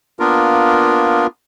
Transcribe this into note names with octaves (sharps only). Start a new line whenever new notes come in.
A#3 B3 D4 F4 A#4